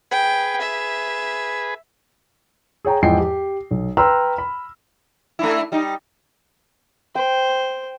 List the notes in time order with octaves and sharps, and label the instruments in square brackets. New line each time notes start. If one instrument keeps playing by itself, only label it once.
[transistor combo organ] G#4 B4 [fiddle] G5
[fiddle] E5
[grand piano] G#4 C#5 G5 A#5
E2 G#2 F3 D#5 G5 C7
G4
B1
B4 G5 A#5 C6 E6 F6
B5
[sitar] A3 D4 E4
G3 D#4
[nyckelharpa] C5 [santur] G5